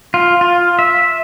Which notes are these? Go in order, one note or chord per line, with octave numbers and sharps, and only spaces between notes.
F4
F4
E5